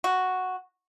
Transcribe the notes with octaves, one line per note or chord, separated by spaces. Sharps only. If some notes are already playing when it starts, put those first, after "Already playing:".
F#4